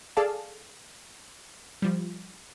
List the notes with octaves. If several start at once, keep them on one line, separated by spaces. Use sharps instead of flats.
G#4 A4 D5 F5 A5
F3 G3